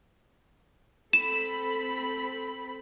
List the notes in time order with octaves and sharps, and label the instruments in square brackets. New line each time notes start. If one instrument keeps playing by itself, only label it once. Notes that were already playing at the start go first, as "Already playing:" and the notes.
[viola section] C4 A4 B5 [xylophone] E7